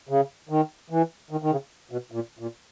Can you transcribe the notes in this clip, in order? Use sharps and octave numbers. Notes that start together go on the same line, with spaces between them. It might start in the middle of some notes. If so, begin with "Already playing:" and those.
C#3
D#3
E3
D#3
D#3
C#3
B2
A#2
A#2